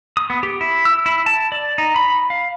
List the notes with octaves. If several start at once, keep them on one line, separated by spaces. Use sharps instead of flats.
D#6
B3
G4
E4
E6
E4
A5
D5
D#4
B5
F5